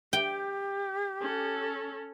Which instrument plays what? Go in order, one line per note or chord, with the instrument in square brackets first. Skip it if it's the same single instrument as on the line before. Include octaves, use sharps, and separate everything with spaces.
[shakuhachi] G4 [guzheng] G5
[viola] C#4 A4